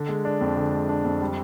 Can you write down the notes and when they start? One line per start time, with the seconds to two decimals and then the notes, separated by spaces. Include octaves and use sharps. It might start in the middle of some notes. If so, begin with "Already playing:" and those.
Already playing: D3
0.09 G#3
0.25 D4
0.41 F2
0.56 D3
0.73 G#3
0.89 D4
1.05 F2
1.21 G3